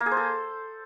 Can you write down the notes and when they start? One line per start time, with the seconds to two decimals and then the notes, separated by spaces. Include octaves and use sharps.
0.01 A#3
0.06 G#4
0.11 C5
0.17 A4